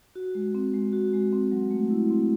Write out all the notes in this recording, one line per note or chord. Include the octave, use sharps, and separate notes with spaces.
F#4
G#3
C4
G#3
F#4
G#3
C4
F#3
A3
E4
C4